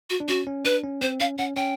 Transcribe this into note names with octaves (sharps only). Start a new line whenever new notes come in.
F#4
D4
C#4 F#4
C#4
D4 B4
C#4
C4 C5
C#4 F5
C#4 F#5
C#4 G5